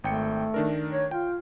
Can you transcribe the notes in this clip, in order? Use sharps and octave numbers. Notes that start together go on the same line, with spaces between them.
G#1 A3 G5 C#7
D#3 D4 A#4
C#5
F4 G5